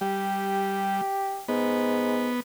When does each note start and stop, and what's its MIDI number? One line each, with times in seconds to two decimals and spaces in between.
0.01 1.01 55
0.01 1.43 67
1.48 2.33 44
1.48 2.40 59